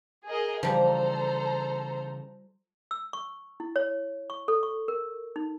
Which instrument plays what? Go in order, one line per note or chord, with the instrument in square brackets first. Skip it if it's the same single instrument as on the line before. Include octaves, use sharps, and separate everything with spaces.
[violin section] G#4 A#4 D#5
[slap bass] C#3 E3 [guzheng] F3 G3 [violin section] A4 C5 A#5
[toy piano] E6
C#6
E4
C#5
C#6
A4
C#6
A#4
D#4